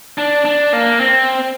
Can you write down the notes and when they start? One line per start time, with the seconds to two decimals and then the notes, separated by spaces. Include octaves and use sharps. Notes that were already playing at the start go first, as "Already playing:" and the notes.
0.18 D4
0.45 D4
0.73 A#3
1.00 C4